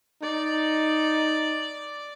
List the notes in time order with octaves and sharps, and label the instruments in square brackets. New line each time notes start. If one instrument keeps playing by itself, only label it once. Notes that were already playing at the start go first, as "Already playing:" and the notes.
[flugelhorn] D#4 [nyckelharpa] D5